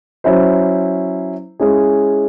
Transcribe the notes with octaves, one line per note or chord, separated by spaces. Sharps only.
F#3 C#4 E4 C5
G#3 C#4 E4 G#4